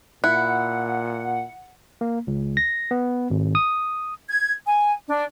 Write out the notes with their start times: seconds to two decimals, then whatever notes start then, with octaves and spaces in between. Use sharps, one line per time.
0.24 A#2 E4 F#5 F#6
2.01 A#3
2.27 C#2
2.57 A#6
2.91 B3
3.30 G#1
3.55 D#6
4.29 G#6
4.66 G#5
5.08 D4